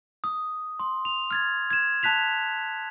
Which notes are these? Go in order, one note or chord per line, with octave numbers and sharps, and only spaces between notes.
D#6
C6
F7
F6 G#6 A6
G#6 E7
A5 F#6 B6 F7